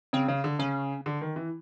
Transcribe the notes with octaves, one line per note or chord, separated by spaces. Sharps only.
C#3 C4
C#3
D3
C#3 C#4
D3
D#3
E3